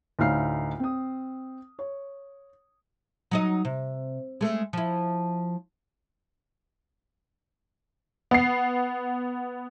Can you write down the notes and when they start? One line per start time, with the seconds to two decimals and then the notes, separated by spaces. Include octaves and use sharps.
0.19 D2 A2 D#4 F5 F6 C7
0.79 C4 D#6
1.79 C#5
3.31 F#3 D#4 D#5
3.65 C3
4.41 G#3 A3
4.73 F3 E4
8.31 B3 C7